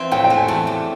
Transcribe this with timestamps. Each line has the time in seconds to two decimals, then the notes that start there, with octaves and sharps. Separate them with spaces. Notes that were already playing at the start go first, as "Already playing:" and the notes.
Already playing: E3 F3 C4
0.11 A2 G5
0.24 G5
0.30 A3
0.37 G#5
0.48 E2 A5
0.67 G3